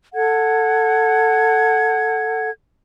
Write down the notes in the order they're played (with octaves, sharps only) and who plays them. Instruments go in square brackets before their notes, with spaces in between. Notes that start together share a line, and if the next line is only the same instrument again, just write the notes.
[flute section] A4 F#5 G#6